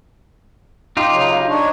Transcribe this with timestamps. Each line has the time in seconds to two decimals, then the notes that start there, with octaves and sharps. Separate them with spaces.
0.97 D#4 F4 G4
1.11 C#3 F#3
1.49 D4 D#4 C#5